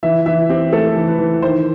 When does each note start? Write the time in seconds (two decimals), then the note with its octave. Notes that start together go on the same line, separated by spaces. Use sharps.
0.03 E3 E5
0.26 E3 E5
0.49 C4 G4
0.72 A3 A4
0.96 E3
1.07 B4
1.18 E3
1.42 D#3 C5